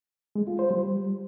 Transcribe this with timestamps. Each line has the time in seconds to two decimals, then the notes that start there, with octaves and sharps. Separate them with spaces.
0.35 G#3
0.47 F4
0.59 C5
0.71 G3